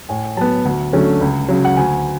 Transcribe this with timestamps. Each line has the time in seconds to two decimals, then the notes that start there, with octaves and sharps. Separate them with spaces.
0.09 A2 G#5
0.37 F#3 B3 A5
0.65 D2
0.93 D3 F#3 A3 C#4
1.21 C#2
1.48 C#3 F#3
1.65 F#5
1.77 D2 G#5